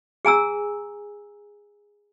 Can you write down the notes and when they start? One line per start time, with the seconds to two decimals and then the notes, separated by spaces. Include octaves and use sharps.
0.25 G#4 G#5 A#5 E6